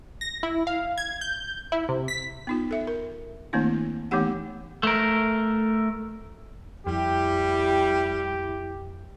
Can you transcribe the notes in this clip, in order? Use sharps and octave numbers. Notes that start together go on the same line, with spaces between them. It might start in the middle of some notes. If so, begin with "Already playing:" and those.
A#6
E4
F5
G#6
G6
E4
C3
B6
B3 D#4 F4
A4 E5
A#4
D#3 A3 A#3 C4 D4 E4
E3 A3 B3 D#4 G4 F#5
A3 A#4
F2 G3 E4 G4